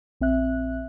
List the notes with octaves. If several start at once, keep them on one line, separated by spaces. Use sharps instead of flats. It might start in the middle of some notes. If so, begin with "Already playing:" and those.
A#1 C4 E5 F#6